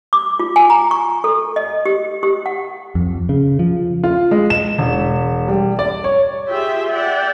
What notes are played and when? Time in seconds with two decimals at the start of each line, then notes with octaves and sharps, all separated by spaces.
0.13 D6
0.39 F4
0.56 G#5
0.70 A#5
0.91 C#6
1.24 A4
1.56 D#5
1.86 G4
2.23 G4
2.46 F#5
2.95 F2
3.29 C#3
3.59 F3
4.04 F4
4.31 G#3
4.50 E7
4.78 E1
5.48 G3
5.79 D5
6.04 C#5
6.48 F4 G4 G#4 E5 G5
6.90 D5 E5 F#5 G5